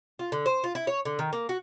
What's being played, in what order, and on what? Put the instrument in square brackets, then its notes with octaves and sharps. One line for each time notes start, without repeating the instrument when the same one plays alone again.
[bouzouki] F4
D3
C5
F4
E4
C#5
D3
D#3
A#3
F#4